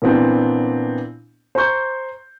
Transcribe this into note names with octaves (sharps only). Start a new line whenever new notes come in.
A#2 E3 B3 C4 D4
C5 A#5 C6 C#6 G6